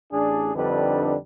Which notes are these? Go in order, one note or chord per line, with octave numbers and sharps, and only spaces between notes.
A1 D4 G#4
F2 D3 G3 D4 D#4 B4